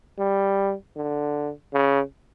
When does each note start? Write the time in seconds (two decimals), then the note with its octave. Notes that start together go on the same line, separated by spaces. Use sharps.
0.19 G3
0.96 D3
1.73 C#3